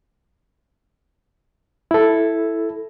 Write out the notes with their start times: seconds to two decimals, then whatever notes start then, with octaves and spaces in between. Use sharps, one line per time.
1.91 E4 A4